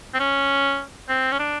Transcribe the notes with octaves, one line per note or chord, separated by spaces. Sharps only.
C4
C#4
C4
C#4
D4